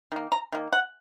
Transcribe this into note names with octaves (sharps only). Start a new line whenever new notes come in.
D#3 A#3
A#5
D#3 A#3
F#5